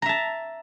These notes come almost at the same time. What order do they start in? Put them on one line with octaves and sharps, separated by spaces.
A#5 E5 A5